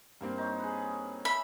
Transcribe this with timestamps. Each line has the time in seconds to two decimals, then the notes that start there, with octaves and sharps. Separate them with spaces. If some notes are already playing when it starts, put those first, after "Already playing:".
0.21 G2 A#3 C4
0.38 D#4 C#5
0.60 G#4 B4
1.25 E5 B5